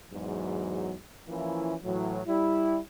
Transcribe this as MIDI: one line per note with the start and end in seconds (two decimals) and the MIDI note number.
0.13 0.95 40
0.13 0.95 44
0.13 0.95 54
1.29 1.75 52
1.29 1.75 53
1.29 1.75 58
1.29 1.75 61
1.29 1.75 64
1.84 2.20 45
1.84 2.20 52
1.84 2.20 54
2.27 2.79 55
2.27 2.79 64